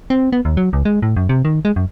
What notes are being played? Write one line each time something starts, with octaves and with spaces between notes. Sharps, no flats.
C4
B3
D#2
F#3
C#2
G#3
A2
F#2
C3
D#3
G#3
F#2